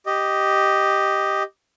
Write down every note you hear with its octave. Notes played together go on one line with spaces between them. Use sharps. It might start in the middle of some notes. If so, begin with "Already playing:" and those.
G4 D#5